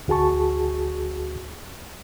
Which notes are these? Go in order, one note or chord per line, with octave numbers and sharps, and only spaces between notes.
D2 F#4 G#4 A5 C#6